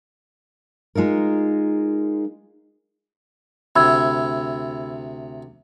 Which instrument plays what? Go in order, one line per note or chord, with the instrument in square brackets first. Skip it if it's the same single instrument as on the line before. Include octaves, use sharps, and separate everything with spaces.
[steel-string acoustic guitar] G#3 D#4 F4 A#4
[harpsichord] D2 C3 [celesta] B5 E6 G#6